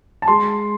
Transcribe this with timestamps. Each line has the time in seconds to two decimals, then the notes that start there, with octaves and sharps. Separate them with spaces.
0.22 A5
0.28 G#3 C6